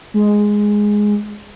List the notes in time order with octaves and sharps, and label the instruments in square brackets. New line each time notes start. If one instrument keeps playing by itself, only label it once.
[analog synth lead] G#3